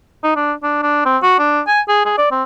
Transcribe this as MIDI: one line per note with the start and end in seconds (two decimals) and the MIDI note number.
0.24 0.33 63
0.36 0.53 62
0.63 0.78 62
0.82 1.04 62
1.05 1.18 60
1.22 1.35 66
1.39 1.61 62
1.67 1.80 80
1.88 2.04 68
2.05 2.14 68
2.18 2.28 74
2.31 2.43 60